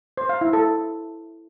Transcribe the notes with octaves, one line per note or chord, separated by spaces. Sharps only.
C5
F5
E4
A4